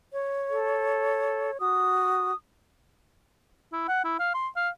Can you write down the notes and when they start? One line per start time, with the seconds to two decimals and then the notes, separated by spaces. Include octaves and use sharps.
0.12 C#5
0.50 A4
1.60 F#4 D#6
3.73 E4
3.88 F#5
4.04 E4
4.19 F5
4.34 C6
4.56 F5